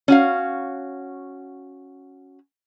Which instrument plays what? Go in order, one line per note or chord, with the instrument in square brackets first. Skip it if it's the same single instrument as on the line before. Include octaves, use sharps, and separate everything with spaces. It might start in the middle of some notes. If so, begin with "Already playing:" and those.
[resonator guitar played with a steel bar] C#4 F#4 F5